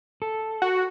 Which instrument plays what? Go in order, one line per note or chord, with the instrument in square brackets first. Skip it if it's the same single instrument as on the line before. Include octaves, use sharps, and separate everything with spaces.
[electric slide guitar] A4
[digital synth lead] F#4